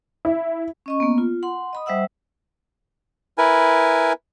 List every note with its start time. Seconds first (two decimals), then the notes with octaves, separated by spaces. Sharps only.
0.25 E4
0.86 C#4 D#5 C#6
1.00 A#3 B3
1.18 F4
1.43 F#5 C6
1.73 D#5 B5 D#6
1.86 G3 C5 E5 F#5 E6
3.38 E4 A#4 B4 G#5